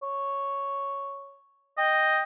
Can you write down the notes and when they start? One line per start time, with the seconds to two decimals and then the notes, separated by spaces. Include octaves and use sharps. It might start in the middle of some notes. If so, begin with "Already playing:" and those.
0.03 C#5
1.78 D#5 G5